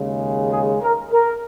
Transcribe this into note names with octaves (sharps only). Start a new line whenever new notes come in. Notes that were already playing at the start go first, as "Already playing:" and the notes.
Already playing: D#2 C#3 G#3
G#4
A#4
A#4